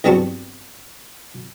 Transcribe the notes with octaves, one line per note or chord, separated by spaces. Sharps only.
E2 G2 F#3 C4 A5 C#6